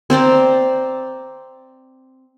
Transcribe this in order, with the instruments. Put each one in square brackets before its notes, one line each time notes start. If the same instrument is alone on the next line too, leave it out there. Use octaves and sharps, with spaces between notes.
[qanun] C4 C5 D5 A#5